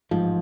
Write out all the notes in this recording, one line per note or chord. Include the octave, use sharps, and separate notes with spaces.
A1 G#2 F3